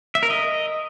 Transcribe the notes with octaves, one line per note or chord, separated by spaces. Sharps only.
E5
A#4
D#5